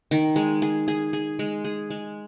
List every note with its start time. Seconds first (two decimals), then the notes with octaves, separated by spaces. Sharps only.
0.11 D#3
0.36 G#3
0.62 G#4
0.88 G#4
1.13 G#4
1.39 G#3
1.65 G#4
1.90 G#3